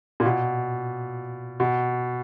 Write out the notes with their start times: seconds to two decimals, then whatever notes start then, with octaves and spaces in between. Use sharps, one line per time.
0.20 A#2
0.25 B2
1.60 B2